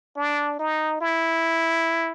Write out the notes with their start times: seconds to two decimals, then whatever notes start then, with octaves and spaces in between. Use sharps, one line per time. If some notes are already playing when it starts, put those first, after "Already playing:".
0.17 D4
0.59 D#4
1.01 E4